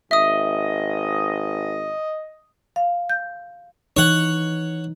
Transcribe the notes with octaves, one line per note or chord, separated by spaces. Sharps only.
G#1 D#5 E5 D#6
F5
G6
E3 D#4 C#5 F#5